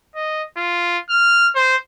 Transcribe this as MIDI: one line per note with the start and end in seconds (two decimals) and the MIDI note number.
0.16 0.43 75
0.57 0.98 65
1.10 1.49 89
1.56 1.76 72